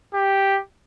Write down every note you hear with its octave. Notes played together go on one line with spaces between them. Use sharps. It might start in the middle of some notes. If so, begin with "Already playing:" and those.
G4